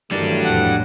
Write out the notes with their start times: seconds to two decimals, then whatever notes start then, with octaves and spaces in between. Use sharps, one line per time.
0.11 G2 D#3 E3 F#3 G3 A3 D4
0.45 F2 A2 F#5